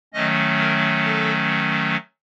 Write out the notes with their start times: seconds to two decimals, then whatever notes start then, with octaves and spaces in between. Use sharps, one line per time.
0.14 D#3 F#3 A3 C#4 D#5
0.59 A#4
1.05 A4